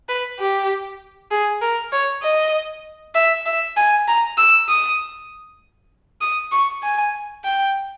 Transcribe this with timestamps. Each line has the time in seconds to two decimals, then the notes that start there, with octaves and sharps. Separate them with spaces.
0.09 B4
0.39 G4
1.31 G#4
1.62 A#4
1.92 C#5
2.23 D#5
3.15 E5
3.46 E5
3.77 G#5
4.08 A#5
4.38 E6
4.69 D#6
6.21 D#6
6.52 C#6
6.83 G#5
7.44 G5